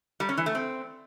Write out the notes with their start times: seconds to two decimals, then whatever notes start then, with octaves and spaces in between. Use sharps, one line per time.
0.20 G3
0.29 C#4
0.37 E3
0.46 A3
0.55 C4